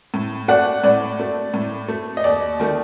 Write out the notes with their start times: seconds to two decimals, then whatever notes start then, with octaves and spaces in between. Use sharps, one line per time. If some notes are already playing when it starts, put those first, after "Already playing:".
0.14 A2
0.48 A3 D5 F#5
0.84 A2 D5
1.20 A3
1.54 A2
1.88 A3
2.17 D#5
2.24 D#2 D5
2.60 D#3 A3